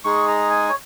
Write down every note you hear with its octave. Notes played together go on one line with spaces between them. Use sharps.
G#3 D#4 G#4 C#6
A#5
G#5
C#5